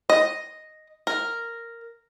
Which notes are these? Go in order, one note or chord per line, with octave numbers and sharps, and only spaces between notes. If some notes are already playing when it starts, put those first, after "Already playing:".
D#5
A#4